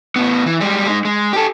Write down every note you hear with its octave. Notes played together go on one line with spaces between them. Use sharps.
A2 B3
E3
G3 G#3
G#3 D#4
G#3
G4 A4